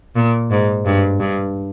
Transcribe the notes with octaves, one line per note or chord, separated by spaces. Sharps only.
A#2
G#2
G2
G2